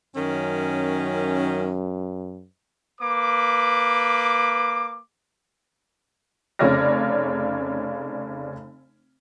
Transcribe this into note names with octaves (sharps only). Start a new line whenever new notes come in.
F#2 D#3 C#4
A#3 B4 D6
F1 C#3 C#5 D5 F6 A#6